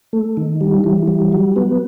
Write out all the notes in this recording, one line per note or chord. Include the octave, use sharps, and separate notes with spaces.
A3
D#3
G3
E3
G3
F#3
B3